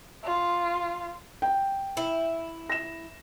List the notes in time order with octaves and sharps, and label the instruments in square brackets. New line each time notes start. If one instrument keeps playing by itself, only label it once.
[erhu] F4
[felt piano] G5
[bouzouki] E4
[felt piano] A#6 E7